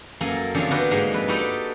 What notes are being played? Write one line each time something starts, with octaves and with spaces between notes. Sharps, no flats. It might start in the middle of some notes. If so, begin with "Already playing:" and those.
F#2 A#3 A4 A#4 G#5
E2 D3 F3 C4 C#4
D3 B3 F#4 G4 A#4 B4
G#2 G#3 A#3 D#4
F2 B4
D#4 F#4 G4 A4 B4 D5